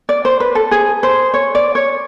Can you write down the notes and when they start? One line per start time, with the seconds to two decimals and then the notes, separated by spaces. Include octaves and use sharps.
0.09 D5
0.25 C5
0.40 B4
0.55 A4
0.71 G#4
1.03 C5
1.34 C#5
1.55 D5
1.75 C#5